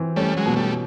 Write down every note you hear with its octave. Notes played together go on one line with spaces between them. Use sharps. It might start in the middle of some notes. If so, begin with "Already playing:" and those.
Already playing: E3 C4
G3 A3 C#4
F#3 G#3
B2
G3 A3